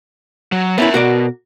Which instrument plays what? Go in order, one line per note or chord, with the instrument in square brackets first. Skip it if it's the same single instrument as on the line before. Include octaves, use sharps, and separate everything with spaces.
[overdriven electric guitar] F#3
[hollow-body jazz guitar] B3 C#4 E4 [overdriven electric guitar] A#4 E5
[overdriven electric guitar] B2 [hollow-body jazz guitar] F#4 A#4 D5